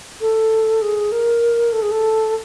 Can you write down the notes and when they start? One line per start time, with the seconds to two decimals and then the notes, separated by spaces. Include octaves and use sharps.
0.21 A4
0.82 G#4
1.12 A#4
1.73 A4
1.82 G#4
1.91 A4